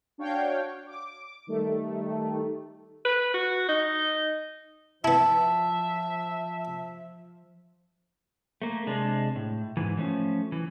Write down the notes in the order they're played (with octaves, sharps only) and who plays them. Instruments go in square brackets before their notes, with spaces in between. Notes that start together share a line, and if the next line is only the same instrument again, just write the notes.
[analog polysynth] D4 F#4 C#5 F5 G5
D6
D#3 G3 A3
[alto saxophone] B4
F#4
D#4
[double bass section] F3 [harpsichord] B3 E4 [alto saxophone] E5 [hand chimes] A5
[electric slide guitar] A3 A#3
C3 G#3 D4
A2
G#2 E3
F3 A3 C#4
E3